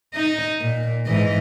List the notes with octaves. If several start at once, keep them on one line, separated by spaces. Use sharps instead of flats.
D#4 D#5
A#2
G#2 E3 D#5